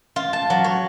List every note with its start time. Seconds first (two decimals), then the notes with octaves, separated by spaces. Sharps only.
0.16 F4
0.33 A5
0.50 F#3
0.64 C#5